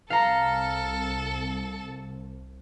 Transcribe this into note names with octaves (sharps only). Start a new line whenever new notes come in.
C2 A4 F5 A#5